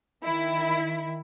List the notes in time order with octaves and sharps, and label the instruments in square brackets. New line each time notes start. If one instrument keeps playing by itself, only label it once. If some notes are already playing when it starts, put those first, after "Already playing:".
[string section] D#3 E4